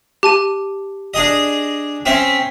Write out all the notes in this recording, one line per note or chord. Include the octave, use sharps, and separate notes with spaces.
G4 A5 D#7
D4 G#4 D#5
C4 C#4 E5